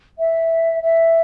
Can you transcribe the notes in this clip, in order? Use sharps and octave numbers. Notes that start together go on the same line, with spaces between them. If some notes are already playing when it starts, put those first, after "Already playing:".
E5
E5